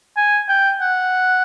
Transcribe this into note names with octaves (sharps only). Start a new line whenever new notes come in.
G#5
G5
F#5